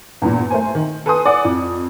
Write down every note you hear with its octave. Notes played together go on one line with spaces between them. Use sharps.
E2 G2 A#2
A3 A#4 C5 G#5
D#3
A4 B4 G#5 C6 D#6
D5 F#5 G#5
F2